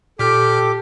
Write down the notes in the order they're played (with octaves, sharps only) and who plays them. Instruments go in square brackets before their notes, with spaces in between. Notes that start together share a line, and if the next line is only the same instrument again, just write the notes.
[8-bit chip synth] A#2 F6 G6 [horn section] G4 [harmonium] A4 [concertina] D6